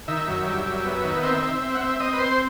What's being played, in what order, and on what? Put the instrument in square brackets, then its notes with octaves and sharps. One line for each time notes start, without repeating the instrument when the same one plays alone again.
[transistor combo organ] D#3 E5
F#2
G3
F#2
B3
D#3
C4 E5
C4
C4
F#5
C4 E5
C4 D#5
B4
C4 C5